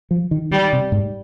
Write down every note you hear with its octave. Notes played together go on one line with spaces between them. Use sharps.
F3
D#3
D#3 G3
C3
G#2